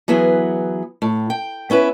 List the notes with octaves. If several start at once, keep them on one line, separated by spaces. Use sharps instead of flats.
E3 F#3 B3 G#4
A2
G5
B3 C#4 E4 B4